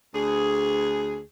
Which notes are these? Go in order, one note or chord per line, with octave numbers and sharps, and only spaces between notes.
D2 G#4